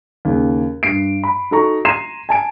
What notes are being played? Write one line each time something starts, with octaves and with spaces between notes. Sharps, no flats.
D#2 C#3
G2 C7 D7
B5
D#4 F#4 A4 A#5 C#6
A#5 C6 G#6 C7 D#7 E7
G#5 A5 D7